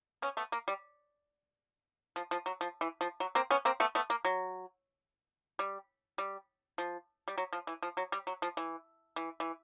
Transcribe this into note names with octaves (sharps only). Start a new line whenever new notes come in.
B3 C#4
A3 B3
A#3
G3
F3
F3
F#3
F3
E3
F3
F#3
A#3 C4
B3 C#4
A#3 C4
A3 B3
A3 B3
A#3
F#3
G3
G3
F3
G3
F#3
F3
E3
F3
F#3
G3
F#3
F3
E3
E3
E3